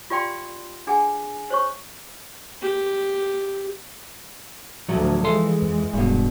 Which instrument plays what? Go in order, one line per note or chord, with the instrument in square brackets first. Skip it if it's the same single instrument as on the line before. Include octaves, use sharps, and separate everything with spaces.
[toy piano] F4 G4 D5 F5 G5 C6
D4 G#4 F#5 G#5
C5 C#5 C#6
[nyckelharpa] G4
[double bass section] D2 D3 [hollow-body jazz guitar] A2 F3 F#3
[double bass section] E3 G#3 [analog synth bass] F3 [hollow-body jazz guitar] A4 E5 C6
[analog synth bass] F2
[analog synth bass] D#1 [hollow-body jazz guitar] G2 B2